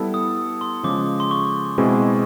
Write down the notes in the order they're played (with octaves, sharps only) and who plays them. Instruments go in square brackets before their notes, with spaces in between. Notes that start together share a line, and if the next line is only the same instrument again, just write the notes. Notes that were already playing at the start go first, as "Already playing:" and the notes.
Already playing: [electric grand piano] G3 B3 E4 A4
[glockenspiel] D#6
C6
[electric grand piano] C#3 F3 G#3 [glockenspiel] D6
[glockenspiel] C6
C#6
[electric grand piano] B2 G#3 C4 E4 G#4